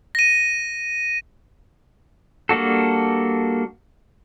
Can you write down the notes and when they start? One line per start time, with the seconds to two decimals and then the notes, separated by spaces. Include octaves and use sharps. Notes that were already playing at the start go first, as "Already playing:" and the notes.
0.15 A#6 D#7
2.49 G3 A#3 D4 F#4 A4